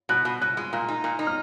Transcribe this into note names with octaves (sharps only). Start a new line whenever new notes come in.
B2 F#6
B2
B2 F#6
G#3
A#2
D#4
A#2
D#4
F6